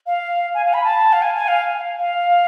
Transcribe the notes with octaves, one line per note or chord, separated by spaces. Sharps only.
F5
G#5
F5
B5
A5
F5
G#5
G#5
F5
F5